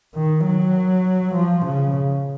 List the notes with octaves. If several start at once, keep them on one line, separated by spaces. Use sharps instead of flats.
D#3
F#3
F3
C#3